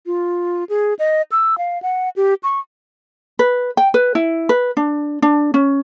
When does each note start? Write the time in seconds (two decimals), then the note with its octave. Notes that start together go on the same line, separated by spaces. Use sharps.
0.06 F4
0.69 G#4
0.99 D#5
1.32 E6
1.58 F5
1.82 F#5
2.16 G4
2.43 C#6
3.39 B4
3.77 G5
3.94 B4
4.15 E4
4.49 B4
4.77 D4
5.22 D4
5.54 C#4